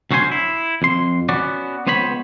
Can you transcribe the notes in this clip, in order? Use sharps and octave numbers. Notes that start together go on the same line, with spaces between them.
D2 F#3 C#4 C5 G#5 C6
E4
F2 C6
B3 C#4 F#4 D5
C#2 B3 C5 C#5 B5